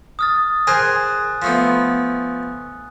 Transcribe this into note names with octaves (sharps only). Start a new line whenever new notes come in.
D#6 F6 A6
G#4 A#4 C5 G#5 F#6
F3 A3 B3